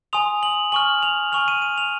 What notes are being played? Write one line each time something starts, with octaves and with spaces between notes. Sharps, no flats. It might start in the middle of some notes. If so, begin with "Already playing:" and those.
G#5 C6 D#6 F7
F#7
G#5 C#6 F6 F#7
F7
G#5 C#6 F6 F7
D#7
D#7
F7